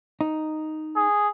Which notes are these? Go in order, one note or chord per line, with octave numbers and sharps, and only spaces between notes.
D#4
G#4